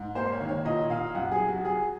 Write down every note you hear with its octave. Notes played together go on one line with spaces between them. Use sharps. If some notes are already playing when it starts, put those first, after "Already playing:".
Already playing: G#2
A#3 C5
C#5
D#3
C#5
A#2 D#5
A#2 F5
F#2 F#5
G#4
F#3
F#4
F#3 G#4